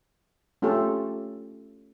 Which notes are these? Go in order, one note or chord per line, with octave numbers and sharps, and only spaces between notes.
A3 C#4 F4 G4 A4